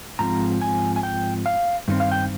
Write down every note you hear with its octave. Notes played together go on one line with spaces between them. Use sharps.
G#2 F3 C4 A#5
G#5
G#5
G5
F5
G2 D#3 C4
F5
G5